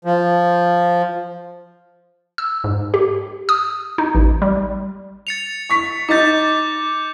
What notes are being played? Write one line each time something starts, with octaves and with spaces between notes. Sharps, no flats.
F3
E6
G#2
G4
D#6
D#4
A1
G3
A6 C#7 F7
C#6 B6
D#4 D#5 D6 G6 A6